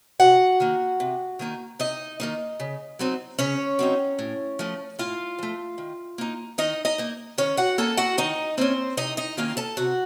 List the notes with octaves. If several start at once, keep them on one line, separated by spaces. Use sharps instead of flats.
C3 F#4 F#5
D#3 A#3
C3
D#3 A#3 D#4
C3 D#4 D#5
D#3 A#3 D#4
C#3
F#3 C4 D#4
C#3 C#4 C#5
F#3 C4 D#4
A2
F3 A3
A2 F4 F5
F3 A3
D#3
A#3 D#4
D#3 D#4 D#5
D#4 D#5
A#3 D#4
D#3 C#4 C#5
F#4 F#5
A#3 C#4 A4 A5
F#4 F#5
D#3 D#4 D#5
A#3 C4 C#4 C5
C3 D#4 D#5
D#4 D#5
D#3 A#3 C#4 F4 F5
A4 A5
C3 F#4 F#5